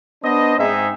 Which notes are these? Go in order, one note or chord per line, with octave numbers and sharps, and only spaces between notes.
B3 D4 C5 D#5
G#2 C4 D#4 G#4 E5